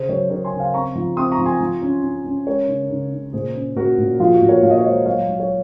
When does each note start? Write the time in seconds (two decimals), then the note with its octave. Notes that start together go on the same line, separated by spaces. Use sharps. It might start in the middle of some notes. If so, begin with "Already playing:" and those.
Already playing: C#3 G#4 C5
0.09 F#3 A#4 C#5
0.30 C#3 A#4 C#5
0.44 G#5 C6
0.53 C#3
0.59 F5 G#5
0.74 C4 A#5 C#6
0.95 F3
1.17 C4 C6 D#6
1.31 A#5 C#6
1.38 F3
1.45 G#5 C6
1.60 F3
1.82 C#4
2.04 C#4
2.25 C#4
2.46 G#3 A#4 C#5
2.68 C#3
2.90 C#3
3.12 C#3
3.33 A#2 G#4 C5
3.55 C#4
3.76 A#2 F#4 A#4
3.98 A#2
4.20 F3 F4 G#4
4.34 F#4
4.42 A#2
4.49 A#4 C#5
4.63 A#2 F5
4.71 D#5
4.78 C#5
4.85 G#3 C5 D#5
5.06 F#3 C#5 F5
5.28 F#3
5.40 C#5